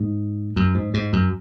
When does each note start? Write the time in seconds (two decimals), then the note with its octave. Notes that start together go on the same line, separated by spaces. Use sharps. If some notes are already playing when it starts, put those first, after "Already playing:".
Already playing: G#2
0.56 F#2
0.75 G#2
0.94 G#2
1.13 F#2